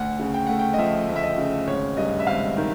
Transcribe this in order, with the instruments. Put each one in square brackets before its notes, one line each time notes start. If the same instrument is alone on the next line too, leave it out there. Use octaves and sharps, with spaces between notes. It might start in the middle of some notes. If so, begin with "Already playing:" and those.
Already playing: [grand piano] D2 F#5
C#3
G5
A3 F#5
G5
D#5
F3 E5
D2
E5
D#5
C#3
G#1 C#5
G2 D#5
E5
G#1 F5
D#3